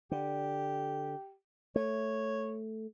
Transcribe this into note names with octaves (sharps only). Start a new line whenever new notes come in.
D3 G4
A3 C#5